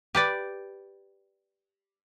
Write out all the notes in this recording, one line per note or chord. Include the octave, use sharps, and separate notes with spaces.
G4 B4 D5